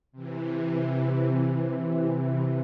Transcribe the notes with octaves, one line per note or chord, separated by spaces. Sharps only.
C3 E3